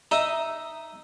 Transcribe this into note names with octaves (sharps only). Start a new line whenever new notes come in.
D#4 D#5 E5